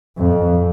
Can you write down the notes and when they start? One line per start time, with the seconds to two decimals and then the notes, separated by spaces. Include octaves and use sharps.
0.17 F2